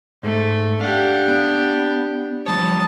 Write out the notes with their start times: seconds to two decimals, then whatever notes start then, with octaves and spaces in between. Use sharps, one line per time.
0.23 G#2 A3
0.81 D4 G4 F5 F#5
1.28 B3
2.46 F3 G3 C#5 A5 D#6